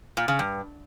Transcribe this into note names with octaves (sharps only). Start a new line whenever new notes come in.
A#2
C#3
G2